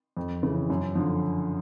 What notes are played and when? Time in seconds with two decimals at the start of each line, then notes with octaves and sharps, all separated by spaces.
0.17 F2
0.43 C#3 E3
0.70 F#2
0.95 D3 F3